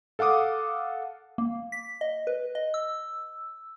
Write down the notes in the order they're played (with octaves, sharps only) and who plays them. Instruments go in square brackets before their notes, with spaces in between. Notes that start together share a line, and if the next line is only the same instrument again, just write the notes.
[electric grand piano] A4 F5 F#5 D6 D#6
[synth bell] A#3
B6
D#5
B4
D#5
E6